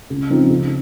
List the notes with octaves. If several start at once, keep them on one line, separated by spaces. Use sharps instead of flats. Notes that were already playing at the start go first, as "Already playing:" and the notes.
C#2
C#3 F3 C4 D#4
C#2